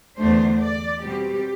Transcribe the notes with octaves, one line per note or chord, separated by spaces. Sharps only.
E2 D3 A3 D4 C5
D5
B2 G3 C4 G4